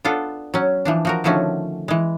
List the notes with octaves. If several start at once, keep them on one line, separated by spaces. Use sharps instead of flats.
B3 D4 F4 A4
F#3 C#4
E3 F3 D4
F3 F#4 A#4
D3 D#3 F3 A3 C#4 F#4
E3 G#3